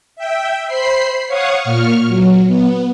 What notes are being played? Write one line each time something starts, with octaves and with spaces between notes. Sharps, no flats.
E5 G5
C5 B5 C7
C#5 F5 F#5 C#6 D#6
A#2 C#6 F6
F#3
B3